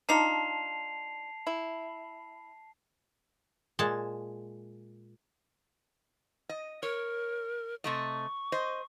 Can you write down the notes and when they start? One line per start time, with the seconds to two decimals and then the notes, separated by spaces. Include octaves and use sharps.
0.09 D4 D#4 F4 A5 C7 F7
1.47 E4
3.79 A#2 G#3 A5
6.49 D#5
6.83 A#4 C#5
7.84 C3 A3 D#5 C#6
8.52 C5 D#5